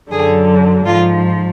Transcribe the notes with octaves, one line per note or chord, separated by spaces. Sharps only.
F#2 D3 F#3 G#4
G#2 F3 F4